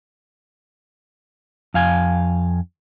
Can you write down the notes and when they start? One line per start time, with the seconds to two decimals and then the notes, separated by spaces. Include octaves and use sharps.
1.74 F2 F5 G#5